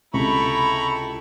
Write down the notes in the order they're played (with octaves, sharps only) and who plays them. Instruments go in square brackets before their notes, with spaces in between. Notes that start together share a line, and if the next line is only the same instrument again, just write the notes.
[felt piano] C#2 C3 [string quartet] E4 A4 G5 [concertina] A#5 B5 C#6